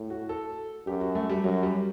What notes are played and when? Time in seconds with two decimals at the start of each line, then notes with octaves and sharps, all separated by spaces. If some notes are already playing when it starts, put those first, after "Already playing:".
Already playing: A2
0.10 F#4
0.29 A4
0.86 F#2 G4
1.01 F#4
1.15 A3
1.29 G3
1.44 F#2 F#3
1.63 G3